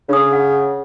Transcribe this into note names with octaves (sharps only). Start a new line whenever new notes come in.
C#3 D4 D#6
F#5